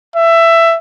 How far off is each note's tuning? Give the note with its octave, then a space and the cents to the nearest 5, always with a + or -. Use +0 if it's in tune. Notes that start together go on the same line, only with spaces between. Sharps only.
E5 +15